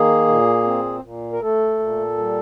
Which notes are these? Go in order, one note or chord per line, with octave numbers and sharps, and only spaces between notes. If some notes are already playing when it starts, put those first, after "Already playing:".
Already playing: D#3 A#3 G#4
A#2
C4
A#2
A#4
A3 A4
A#2
G3